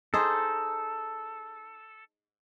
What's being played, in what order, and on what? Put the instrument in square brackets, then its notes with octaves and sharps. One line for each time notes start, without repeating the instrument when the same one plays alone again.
[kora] D#4 G#4 C5 [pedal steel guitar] A4